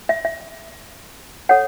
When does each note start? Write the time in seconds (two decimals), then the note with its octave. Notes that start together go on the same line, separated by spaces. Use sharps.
0.09 E5
0.25 E5
1.49 A4 C#5 F#5